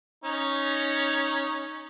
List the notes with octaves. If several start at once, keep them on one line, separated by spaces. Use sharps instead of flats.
C#4 D#4